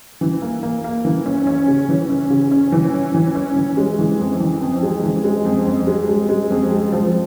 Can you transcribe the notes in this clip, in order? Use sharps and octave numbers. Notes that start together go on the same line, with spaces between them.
E3
A#3
A#3
A#3
E3
C#4
C#4
C#3
E3
C#4
C#3
C#4
E3
C#4
E3
C#4
E3
G#3
E3
F2
E3
F2
G#3
E3
G#3
F2
F2
G#3
G#3
G#3
F2
G#3
F3